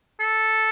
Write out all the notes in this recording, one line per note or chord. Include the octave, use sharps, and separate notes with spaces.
A4